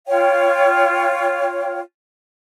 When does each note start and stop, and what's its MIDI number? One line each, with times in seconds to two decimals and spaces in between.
0.07 1.80 65
0.07 1.80 73
0.07 1.80 77
0.07 1.80 79